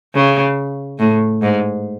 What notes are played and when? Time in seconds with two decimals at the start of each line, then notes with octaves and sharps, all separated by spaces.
0.14 C#3
0.99 A2
1.42 G#2